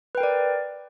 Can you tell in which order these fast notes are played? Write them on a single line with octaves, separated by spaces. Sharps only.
B4 G5 A#4 D5